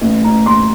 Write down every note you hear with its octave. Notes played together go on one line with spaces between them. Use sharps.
A1
A1 A#5
A1 C6